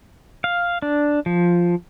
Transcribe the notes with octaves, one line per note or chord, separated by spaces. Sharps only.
F5
D4
F3